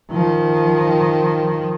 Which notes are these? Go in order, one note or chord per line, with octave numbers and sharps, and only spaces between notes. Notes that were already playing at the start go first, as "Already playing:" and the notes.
D#3 F3